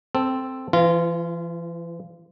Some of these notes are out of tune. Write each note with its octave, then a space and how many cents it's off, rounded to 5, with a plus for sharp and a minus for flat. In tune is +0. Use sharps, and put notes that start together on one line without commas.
C4 +0 A4 +0
E3 +35 F4 -20